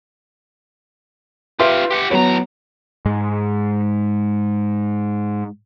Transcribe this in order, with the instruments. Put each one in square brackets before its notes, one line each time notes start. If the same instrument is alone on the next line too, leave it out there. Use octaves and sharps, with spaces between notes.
[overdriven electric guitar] F4 G4 [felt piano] B4 E5 C6
[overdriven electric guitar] G4 F#5
[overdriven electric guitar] A2 A#5 [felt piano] F#3 B3 C#5
[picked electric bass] G#2 G#3